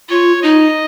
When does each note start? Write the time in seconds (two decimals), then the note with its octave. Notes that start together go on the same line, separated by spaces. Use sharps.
0.10 F4 C#5
0.42 D#4 D#5